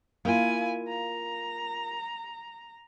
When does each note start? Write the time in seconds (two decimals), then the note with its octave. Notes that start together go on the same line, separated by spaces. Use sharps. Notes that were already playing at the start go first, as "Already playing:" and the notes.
0.25 A#3 E4 F4 G#5
0.88 A#5